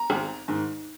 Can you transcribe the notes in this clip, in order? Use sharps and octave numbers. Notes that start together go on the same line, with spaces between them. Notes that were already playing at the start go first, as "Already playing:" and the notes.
Already playing: A#5
G#1
G#2 D#3